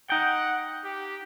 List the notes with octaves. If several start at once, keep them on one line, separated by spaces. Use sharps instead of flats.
D#4 F#5 G5
G4